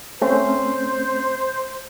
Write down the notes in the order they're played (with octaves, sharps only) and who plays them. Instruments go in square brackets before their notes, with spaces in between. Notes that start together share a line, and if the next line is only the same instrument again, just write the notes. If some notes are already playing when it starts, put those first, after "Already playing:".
[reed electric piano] A3 C4 C#4 [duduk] C5